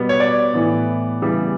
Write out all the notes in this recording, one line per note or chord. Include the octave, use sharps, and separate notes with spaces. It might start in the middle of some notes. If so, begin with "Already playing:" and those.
Already playing: B2 G3 B3
C#5
D5
A2 E3 B3
C#3 E3 G3 B3